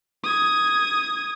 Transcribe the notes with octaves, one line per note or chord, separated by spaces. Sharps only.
D#6 G#6